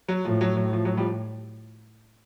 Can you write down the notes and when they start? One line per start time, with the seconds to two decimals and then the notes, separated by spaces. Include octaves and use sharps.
0.08 F#3
0.24 A2 F3
0.41 F#3
0.57 F#3
0.73 F3
0.85 F#3
0.97 F3 G3